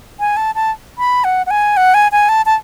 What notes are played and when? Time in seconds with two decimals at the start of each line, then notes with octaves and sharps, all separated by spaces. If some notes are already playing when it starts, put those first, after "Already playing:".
0.20 G#5
0.37 A5
0.55 A5
0.98 B5
1.24 F#5
1.46 F#5
1.51 G#5
1.77 F#5
1.94 G#5
2.12 G#5
2.29 A5
2.46 A5